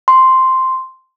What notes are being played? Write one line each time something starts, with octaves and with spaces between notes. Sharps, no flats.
C6